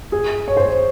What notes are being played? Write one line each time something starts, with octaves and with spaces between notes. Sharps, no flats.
G#4
C#5
C5
C#5